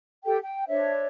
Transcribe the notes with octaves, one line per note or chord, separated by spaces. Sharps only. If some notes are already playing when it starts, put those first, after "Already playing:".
G4 A4 G5
G5
D4 C5 C#5 E5